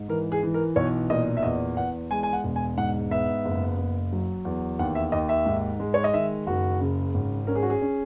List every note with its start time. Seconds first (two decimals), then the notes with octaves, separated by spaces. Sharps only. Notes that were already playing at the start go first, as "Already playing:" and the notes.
Already playing: G#2
0.08 E3 A#4
0.32 G#4
0.43 E3
0.54 A#4
0.76 B1 C#5
1.10 A#2 D#5
1.37 E5
1.43 E2 D#5
1.76 E2 F#5
2.11 G#3 G#5
2.23 G#5
2.33 F#5
2.44 E1
2.56 G#5
2.77 G#2 F#5
3.11 B3 E5
3.45 F#1
3.78 F#1
4.13 F#3
4.45 E2
4.79 D#2 F#5
4.95 E5
5.12 D#2 D#5
5.29 E5
5.46 G#2
5.80 G#3
5.94 C#5
6.04 D#5
6.14 D#3 E5
6.47 F#1 F#4
6.81 C#3
7.14 G#1
7.47 C#4 A#4
7.55 G#4
7.63 F#4
7.70 G#4
7.82 C#4